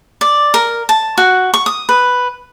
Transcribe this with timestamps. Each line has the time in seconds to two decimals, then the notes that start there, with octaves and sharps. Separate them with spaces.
0.21 D5
0.54 A#4
0.89 A5
1.18 F#4
1.54 C#6
1.66 D#6
1.89 B4